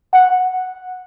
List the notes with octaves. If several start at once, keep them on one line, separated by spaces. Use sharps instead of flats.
F#5